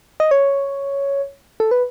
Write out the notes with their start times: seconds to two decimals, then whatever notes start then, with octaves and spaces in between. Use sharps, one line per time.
0.20 D#5
0.31 C#5
1.60 A4
1.71 B4